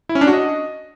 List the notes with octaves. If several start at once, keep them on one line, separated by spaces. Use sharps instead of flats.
E4
C#4
D4
F#4
D#5